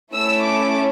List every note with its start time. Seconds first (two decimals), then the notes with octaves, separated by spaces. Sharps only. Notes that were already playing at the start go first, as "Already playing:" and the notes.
0.14 A3 C#4 E4 E6
0.44 D6